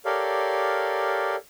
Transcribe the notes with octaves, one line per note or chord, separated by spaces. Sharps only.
G4 A4 A#4 C#5 D5 F5